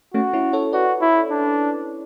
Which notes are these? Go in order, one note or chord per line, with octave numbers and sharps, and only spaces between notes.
A3 C#4 F#4
C#4 E4
A4 C#5
F#4 B4 D5
E4
D4